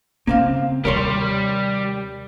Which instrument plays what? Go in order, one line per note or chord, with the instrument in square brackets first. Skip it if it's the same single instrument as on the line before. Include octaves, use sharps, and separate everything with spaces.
[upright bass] C#3 [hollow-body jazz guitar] A#3 C4 F5
[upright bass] D#2 C3 [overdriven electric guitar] G3 [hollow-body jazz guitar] A#4 C#5 C6